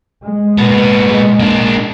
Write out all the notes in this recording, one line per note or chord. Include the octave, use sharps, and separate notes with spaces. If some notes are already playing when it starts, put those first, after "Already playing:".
G#3
A#2 B3
G#3
A#3 D4